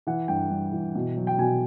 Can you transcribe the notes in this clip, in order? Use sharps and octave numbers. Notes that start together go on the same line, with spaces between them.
E3 F#5
G2 G5
G2
E3
B2
F#3
G5
B2 G#5